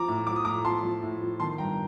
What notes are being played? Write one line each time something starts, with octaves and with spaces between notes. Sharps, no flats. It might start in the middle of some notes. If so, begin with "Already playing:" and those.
Already playing: F3 A#5 D6
A2
F3 D6
D#6
A2 A#5 D6
F3 A5 C6
F3
A2
F3
D#3 A5 C6
G2 G5 A#5